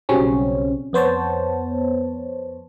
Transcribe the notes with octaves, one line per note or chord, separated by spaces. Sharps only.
B1 C#3 F#3 G3 C4 C#4
F2 B3 C5 C#5 A5